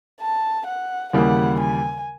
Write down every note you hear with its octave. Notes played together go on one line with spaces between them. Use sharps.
A5
F#5
D#2 C#3 E3 G3 A#3 F#5
G#5